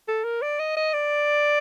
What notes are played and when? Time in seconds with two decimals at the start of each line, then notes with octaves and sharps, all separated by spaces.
0.08 A4
0.24 A#4
0.42 D5
0.59 D#5
0.77 D#5
0.93 D5